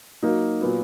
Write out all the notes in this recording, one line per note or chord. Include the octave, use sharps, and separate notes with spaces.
F#3 A#3 D#4
A#2 F#3 B3